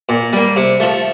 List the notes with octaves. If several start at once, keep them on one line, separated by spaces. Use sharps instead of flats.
A#2
G3 A#3
C3
F3 A3